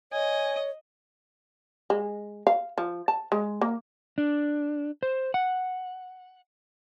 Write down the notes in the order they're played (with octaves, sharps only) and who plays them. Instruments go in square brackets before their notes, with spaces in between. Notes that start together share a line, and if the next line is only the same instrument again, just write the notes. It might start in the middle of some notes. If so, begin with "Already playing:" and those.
[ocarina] C#5 [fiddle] D#5 [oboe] G#5
[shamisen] G#3
F5
F3
A5
G#3
A#3
[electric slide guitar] D4
C5
F#5